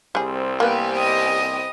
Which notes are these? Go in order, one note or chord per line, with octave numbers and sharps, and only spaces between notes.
C2 G3 C4 G#4 C5
A#3 B3 G4 B4 G#5
D#5 D#6